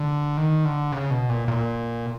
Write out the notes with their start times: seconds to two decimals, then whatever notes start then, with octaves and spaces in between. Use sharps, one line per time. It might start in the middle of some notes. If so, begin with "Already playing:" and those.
Already playing: D3
0.37 D#3
0.65 D3
0.92 C#3
1.11 B2
1.29 A#2
1.48 A#2